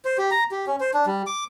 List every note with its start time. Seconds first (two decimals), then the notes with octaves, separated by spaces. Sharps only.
0.05 C5
0.18 G4
0.31 A#5
0.51 G4
0.67 C#4
0.80 C5
0.94 D4
1.06 G3
1.26 D6